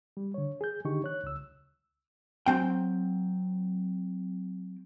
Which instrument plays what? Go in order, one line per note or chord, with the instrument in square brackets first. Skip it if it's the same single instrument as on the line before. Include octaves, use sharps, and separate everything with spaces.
[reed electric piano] G3
D3 C#5
G#4 G6
D3 D#3 D#4 G4 C#6
C#5 F#6
C#2 E6
[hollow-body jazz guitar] F#3 C4 G5